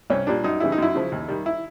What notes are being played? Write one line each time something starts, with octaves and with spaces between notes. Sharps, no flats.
C2 C#4
A#2 G3 D4
F#2 D#4
C#3 E3 G3 E4
D#4
F#2 E4
C#3 F3
D#2
D#3 G3
E4